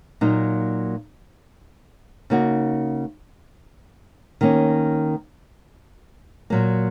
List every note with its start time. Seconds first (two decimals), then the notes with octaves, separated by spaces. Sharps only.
0.21 A#2 F#3 A#3 D#4
2.30 C#3 A#3 D#4 F#4
4.41 D#3 A#3 C#4
6.50 A#2 F#3 A#3